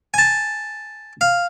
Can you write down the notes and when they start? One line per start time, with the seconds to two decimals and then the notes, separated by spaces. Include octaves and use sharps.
0.14 G#5 A5
1.21 F5